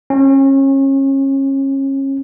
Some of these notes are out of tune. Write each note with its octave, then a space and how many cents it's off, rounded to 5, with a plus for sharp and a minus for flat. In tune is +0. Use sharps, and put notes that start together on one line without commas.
C#4 -30